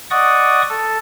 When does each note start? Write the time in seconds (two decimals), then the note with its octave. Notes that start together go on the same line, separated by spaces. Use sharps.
0.11 D5 D#5 F#5 C#6 D#6
0.69 A4